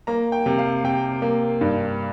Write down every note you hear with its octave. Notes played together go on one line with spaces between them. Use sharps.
A#3 A#5
G5
C3
F5
C3 G5
A#3
G2